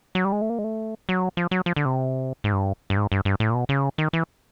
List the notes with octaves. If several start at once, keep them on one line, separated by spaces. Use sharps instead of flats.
F#3
G3
G#3
A3
A#3
G#3
A3
F#3
F3
F#3
F3
D3
C3
G#2
G2
G2
G#2
G2
G2
A2
A#2
B2
C#3
D#3
E3